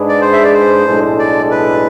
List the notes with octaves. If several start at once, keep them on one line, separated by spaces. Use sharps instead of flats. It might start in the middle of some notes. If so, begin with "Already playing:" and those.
Already playing: G#2 G#3 D4 G#4 B4
D5
C5
E5
D5
C5
B1 A2 G#3 D4 A4
D5
B4